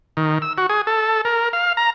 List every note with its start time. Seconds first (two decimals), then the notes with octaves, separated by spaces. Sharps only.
0.17 D#3
0.42 E6
0.58 F#4
0.70 G#4
0.87 A4
1.25 A#4
1.53 F5
1.77 A#5